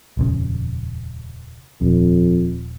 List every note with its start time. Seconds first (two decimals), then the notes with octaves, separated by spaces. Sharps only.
0.17 D#1 F2 C#3
1.81 D#1 F2